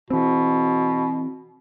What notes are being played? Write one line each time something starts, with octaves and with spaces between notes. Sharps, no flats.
B2 E3 C4